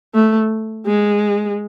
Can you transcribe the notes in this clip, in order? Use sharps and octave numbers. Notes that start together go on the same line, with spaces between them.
A3
G#3